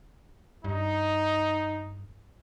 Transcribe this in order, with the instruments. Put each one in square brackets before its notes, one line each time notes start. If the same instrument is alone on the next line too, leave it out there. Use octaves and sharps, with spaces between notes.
[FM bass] G2 [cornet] D#4